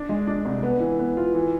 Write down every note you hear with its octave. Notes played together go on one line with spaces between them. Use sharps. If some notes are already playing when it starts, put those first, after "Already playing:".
Already playing: D4
G#3
D4
C2
B3
E3
B3
F4
E3